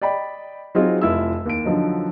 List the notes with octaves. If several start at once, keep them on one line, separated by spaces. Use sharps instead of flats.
D5 D#5 G5 B5
F#3 C4 D#4 F4 G#4
F1 E4 F4 E6
D#2 D7
D3 F3 F#3 D#4